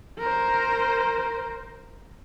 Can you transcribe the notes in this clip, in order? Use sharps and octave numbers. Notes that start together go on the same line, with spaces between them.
A#4 C5